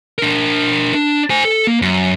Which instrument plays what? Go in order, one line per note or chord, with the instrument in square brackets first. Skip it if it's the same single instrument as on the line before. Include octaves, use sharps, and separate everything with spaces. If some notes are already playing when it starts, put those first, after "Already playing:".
[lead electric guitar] D4 A#4
D4
C5 G#5
A4
A#3
F#2